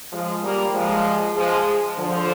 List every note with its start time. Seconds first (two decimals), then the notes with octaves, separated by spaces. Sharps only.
0.13 F3 G#3
0.43 G3 A#3
0.74 F3 G#3
1.36 F3 G#3
1.99 D3 F3